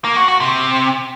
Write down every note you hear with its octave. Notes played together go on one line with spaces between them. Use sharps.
A#3
F#4
F#4
C3